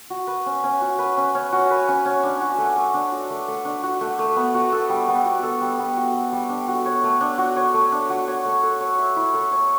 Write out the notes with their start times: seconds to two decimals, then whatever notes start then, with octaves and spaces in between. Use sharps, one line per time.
0.10 F#4
0.27 B4
0.46 C#4
0.64 C#4
0.82 F#4
0.99 B4
1.17 C#4
1.35 C#4
1.52 F#4
1.71 B4
1.88 C#4
2.05 C#4
2.23 D4
2.41 F#4
2.58 A3
2.76 A3
2.94 D4
3.12 F#4
3.30 A3
3.48 A3
3.65 D4
3.83 F#4
4.01 A3
4.19 A3
4.36 B3
4.54 F#4
4.72 A4
4.89 G3
5.08 B3
5.25 F#4
5.43 A4
5.61 G3
5.79 B3
5.97 F#4
6.14 A4
6.32 G3
6.49 D4
6.68 F#4
6.86 C#5
7.04 A3
7.21 D4
7.38 F#4
7.56 C#5
7.74 A3
7.92 D4
8.10 F#4
8.28 C#5
8.45 A3
8.63 A4
8.81 C#5
8.99 E5
9.16 E4
9.34 A4
9.51 C#5